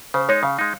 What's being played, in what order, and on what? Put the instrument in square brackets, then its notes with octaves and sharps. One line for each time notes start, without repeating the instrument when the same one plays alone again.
[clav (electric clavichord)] C#3 [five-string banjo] C5
[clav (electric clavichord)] G#3 D#4 [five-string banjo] C#5
[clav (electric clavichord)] C#3 [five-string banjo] F5
[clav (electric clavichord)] G#3 D#4